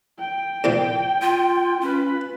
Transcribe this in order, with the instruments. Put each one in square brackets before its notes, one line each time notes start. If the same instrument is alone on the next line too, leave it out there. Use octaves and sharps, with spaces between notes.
[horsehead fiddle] G5
[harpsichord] E2 A#2 F3
[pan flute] F4
[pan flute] C#4 [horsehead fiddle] F4 B4